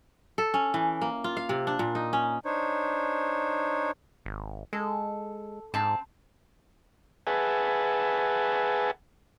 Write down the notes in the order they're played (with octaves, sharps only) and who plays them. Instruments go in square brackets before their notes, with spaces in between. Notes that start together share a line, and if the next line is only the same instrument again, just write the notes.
[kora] A4
C#4
E3
A#3
F4
F5
C3
D4
A#2
D#4
C#4
[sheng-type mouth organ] D4 D#4 C5 C#5
[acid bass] G#1
[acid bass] G#3 [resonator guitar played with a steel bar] A4
[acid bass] G#2 [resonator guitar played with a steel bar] C4 A5
[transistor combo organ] G#4 B4 E5 F#5 G#5 A5